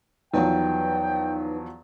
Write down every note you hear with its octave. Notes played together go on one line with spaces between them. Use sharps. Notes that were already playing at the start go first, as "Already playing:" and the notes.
E2 F3 F#3 D#4 B4 C#5 G5